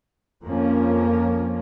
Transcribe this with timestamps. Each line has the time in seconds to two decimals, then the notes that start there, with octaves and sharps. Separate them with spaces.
0.44 F2 F3 A#3 C#4